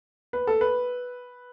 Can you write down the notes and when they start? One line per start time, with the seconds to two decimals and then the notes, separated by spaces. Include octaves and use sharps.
0.33 B4
0.47 A4
0.61 B4